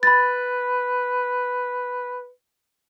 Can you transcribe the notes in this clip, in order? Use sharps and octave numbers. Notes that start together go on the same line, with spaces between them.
B4 B5 A6